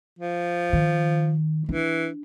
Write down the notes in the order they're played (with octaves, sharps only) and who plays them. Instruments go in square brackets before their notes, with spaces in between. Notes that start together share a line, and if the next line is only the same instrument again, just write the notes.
[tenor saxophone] F3
[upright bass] D#3
[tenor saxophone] E3 [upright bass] D4